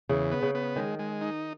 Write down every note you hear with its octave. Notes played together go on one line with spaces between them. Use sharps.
E2 C#3
B3
C#3
B3
D#3 G#3
G#3
D#4